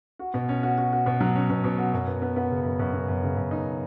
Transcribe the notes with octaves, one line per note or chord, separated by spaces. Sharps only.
F#4
B2
C#4
F#4
F#4
F#4
B2
F#3
C#4
B2
B2
F#4
F#2
B3
B3
B3
C#3
F#2
F#2
B3
F#2
C#3
F#2
D#4